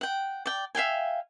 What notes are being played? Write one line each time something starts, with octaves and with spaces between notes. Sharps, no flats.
F#5 G5
D5 G5
E5 F5 G5 G#5